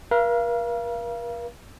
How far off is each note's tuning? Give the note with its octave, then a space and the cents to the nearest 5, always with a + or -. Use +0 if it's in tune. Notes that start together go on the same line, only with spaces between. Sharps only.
A#4 +40 F5 -30